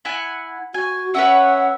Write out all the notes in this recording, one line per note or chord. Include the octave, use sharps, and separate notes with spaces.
E4 F#5 G#5
F#4 G#5
C#4 B4 C#5 E5 F#5